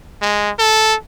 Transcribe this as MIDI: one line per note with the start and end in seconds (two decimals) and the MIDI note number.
0.22 0.50 56
0.59 0.95 69